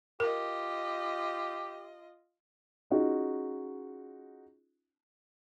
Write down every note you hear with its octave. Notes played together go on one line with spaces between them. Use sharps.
F4 G4 A#4 D#5
C#4 D#4 F4 F#4 G#4